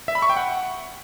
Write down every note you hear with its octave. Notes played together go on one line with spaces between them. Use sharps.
E5
B5
C#6
G5
F#5